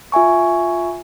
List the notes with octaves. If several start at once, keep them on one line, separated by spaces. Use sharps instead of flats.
F4 E5 G#5 C#6